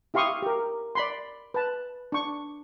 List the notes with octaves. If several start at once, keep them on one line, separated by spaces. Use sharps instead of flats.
E4 G4 F5 C6 C#6 D#6
G4 A#4
D5 B5 C6
B4 A5
D4 C#6